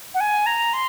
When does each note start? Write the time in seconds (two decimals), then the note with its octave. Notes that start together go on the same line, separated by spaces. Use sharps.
0.14 F#5
0.20 G#5
0.46 A#5
0.73 C6